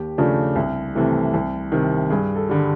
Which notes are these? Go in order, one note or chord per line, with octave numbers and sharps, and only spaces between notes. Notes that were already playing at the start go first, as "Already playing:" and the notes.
Already playing: D#2 G4
C#3 F3 A3 D4
C2
C3 E3 A3
C2
C3 D#3
G2 G#4
A4
D3 G3